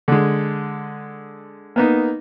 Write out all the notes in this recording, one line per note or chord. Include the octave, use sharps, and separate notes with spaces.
D3 G#3
A#3 B3 D#4